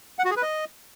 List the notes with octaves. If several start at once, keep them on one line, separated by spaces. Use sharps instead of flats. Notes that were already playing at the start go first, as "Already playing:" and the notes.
F#5
F#4
G#4
B4
D#5